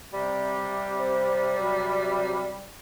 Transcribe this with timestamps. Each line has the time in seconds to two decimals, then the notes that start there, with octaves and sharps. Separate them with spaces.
0.14 C3 G3
0.99 C5
1.59 F#3